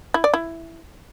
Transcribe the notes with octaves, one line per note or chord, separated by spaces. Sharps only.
E4
D5
E4